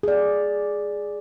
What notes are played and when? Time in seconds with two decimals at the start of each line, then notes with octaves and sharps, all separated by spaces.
0.03 G#4 D5